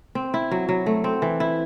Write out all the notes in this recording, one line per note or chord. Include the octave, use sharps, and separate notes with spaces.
C4
E4
F#3
F#3
A3
C4
E3
E4